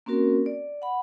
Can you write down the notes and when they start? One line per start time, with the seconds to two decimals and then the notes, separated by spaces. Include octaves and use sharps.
0.06 A#3 C4 C#4 F#4 A#4
0.46 D5
0.82 F#5 B5